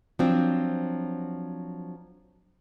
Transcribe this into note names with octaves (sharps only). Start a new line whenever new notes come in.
F3 F#3 C4 D4